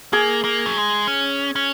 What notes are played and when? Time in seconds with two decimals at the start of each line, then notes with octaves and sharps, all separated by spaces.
0.13 A#3 G#4
0.44 A#3
0.66 F#3
0.77 G#3
1.07 C#4
1.56 C#4